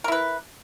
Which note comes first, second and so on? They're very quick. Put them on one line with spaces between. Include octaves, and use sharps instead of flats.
A#4 E4 B4